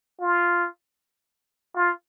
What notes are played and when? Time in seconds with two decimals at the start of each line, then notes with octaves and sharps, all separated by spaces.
0.21 F4
1.75 F4